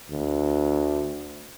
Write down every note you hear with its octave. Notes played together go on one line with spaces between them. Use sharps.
D2